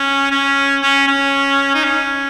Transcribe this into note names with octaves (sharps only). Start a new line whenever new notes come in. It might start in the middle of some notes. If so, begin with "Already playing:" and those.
Already playing: C#4
C#4
C#4
C#4
D#4
C#4